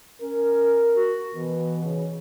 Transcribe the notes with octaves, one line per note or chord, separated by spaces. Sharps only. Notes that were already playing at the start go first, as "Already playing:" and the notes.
C#4 A#4
F#4
B2 E3
C#3